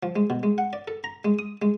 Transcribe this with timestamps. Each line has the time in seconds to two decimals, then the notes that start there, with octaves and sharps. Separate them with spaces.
0.03 F3
0.16 G#3
0.30 B2
0.43 G#3
0.58 F#5
0.73 D5
0.88 A4
1.04 A#5
1.25 G#3
1.39 D#6
1.62 G#3